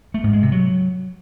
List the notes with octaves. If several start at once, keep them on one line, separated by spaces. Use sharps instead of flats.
A3
G#2
G#3
C3
F#3